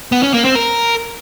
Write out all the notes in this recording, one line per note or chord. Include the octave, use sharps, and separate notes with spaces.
B3
C#4
A#3
C4
A#4